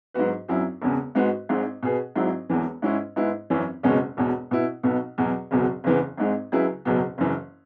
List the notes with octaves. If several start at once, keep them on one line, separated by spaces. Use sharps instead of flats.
G#2 F#3 B3 F#4 B4
G#1 F#2 F#3 E4
E1 E2 C#3
G#2 G#3 B3 F#4 B4
G#1 G#2 G#3
B2 B3 G#4 B4
G#1 G#2 F#3 E4
E1 E2 E3
G#2 G#3 C#4 E4
G#2 G#3 B3 E4
G#1 F#2 E3 C#4
F#1 E2 B2 G#3 C#4
E1 E2 B2
B2 B3 E4
B1 B2 B3
E2 B2 F#3
F#1 E2 B2 F#3
F#1 E2 C#3 E3 B3
G#1 G#2 G#3
C#2 C#3 F#3 E4 B4
F#1 E2 B2 F#3 B3
F#1 F#2 E3